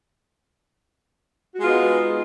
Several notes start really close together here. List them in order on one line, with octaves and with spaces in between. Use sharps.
F#4 G#3 F4 B3 D#4